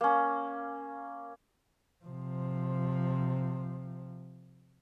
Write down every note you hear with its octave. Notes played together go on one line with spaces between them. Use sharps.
A#3 C#4
C3 F3